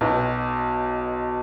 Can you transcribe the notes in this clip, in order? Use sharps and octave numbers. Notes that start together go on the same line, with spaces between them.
B1 B2